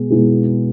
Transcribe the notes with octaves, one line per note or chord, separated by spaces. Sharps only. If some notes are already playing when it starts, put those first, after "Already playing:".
Already playing: B2 G#3 B3 G#4
B2 G#3 B3 E4 G#4